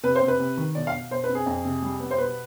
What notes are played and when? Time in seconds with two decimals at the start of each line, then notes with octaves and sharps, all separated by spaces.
0.03 C3 B4
0.15 C5
0.21 C3
0.28 B4
0.40 C3
0.57 D#3
0.75 B2 D5
0.87 F5
0.93 B2
1.11 B2 C5
1.24 B4
1.29 C4
1.35 G#4
1.46 F2
1.65 C3
1.82 G3
2.00 B3
2.11 C5
2.18 B2 B4